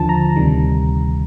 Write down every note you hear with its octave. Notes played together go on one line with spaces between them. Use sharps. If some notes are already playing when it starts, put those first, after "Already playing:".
Already playing: D#2 D3 F3 A5
A#5
D2 C3 D#3 G3